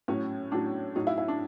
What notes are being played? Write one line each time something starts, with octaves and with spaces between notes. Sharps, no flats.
A2 F#3 C#4
A2 F#3 D4
A2 F#3 D#4
E4
E4
D4